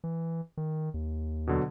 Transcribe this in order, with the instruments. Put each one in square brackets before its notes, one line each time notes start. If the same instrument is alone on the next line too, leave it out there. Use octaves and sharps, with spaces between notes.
[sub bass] E3
D#3
D#2
[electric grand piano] B2 D3 F#3